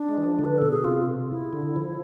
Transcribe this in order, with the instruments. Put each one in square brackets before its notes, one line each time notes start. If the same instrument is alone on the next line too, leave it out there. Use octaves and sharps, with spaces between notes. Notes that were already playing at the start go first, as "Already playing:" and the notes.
Already playing: [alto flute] D4
[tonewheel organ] G#3
E3
F3
D3
[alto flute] B4
[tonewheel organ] B2 [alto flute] A4
[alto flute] G#4
[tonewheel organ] C3 [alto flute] F4
[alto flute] E4
[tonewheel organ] D3
F3